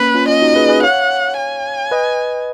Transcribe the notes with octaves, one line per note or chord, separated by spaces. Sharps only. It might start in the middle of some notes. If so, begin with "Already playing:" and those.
Already playing: A#3 C#4 B4
C#4 F4
C#4 F4 D#5
D#4 F#4
G#4 B4
G#4 B4
C#5 F5 F#5
G#5
B4 D#5